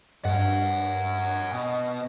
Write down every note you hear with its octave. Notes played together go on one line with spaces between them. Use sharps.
G2 F#5 G#5
B2